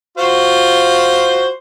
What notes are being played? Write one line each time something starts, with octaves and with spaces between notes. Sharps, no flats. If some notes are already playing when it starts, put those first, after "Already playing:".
F4 F#4 C5